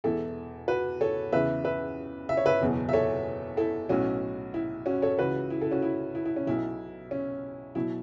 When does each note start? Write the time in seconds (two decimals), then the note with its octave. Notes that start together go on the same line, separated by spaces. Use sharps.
0.04 E1 E2 E3 E4 A4
0.68 F#4 B4
1.01 A4 C#5
1.32 E2 C#3 E3 B4 E5
1.65 B4 E5
2.29 E5
2.37 C#5
2.46 B4 E5
2.61 F#1 E2 B2 F#3
2.89 E5
2.93 A4 C#5
3.57 E4 A4
3.89 B1 A2 F#3 C#4 F#4
4.54 E4
4.86 C#4 F#4
5.02 A4 C#5
5.18 C#2 C#3 E3 F#4 B4
5.50 E4
5.61 E4 A4
5.71 C#4 F#4
5.82 E4
6.15 E4
6.25 E4
6.36 C#4
6.47 B1 B2 F#3 E4
7.11 C#4
7.75 B2 F#3 E4